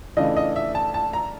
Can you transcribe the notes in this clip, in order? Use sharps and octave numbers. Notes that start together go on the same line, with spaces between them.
C#3 E3 A3 D4 F4 D#5
D#5
E5
A5
A5
A#5